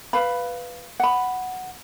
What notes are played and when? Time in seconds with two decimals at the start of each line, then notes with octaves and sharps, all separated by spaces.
0.13 B4 F5 B5
1.00 F#5 B5